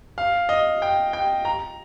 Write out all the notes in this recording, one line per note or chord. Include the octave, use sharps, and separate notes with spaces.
F5
D#5
G5
G5
A#5